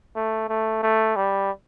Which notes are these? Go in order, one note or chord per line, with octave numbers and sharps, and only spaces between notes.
A3
A3
A3
G3